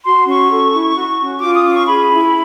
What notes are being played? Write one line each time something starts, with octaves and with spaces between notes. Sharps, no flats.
F#4 C6
C#4 C#6
A4
E4
F#4
C#4
F4 D6
D#6
C#4 D6
C#6
G#4 B5
E4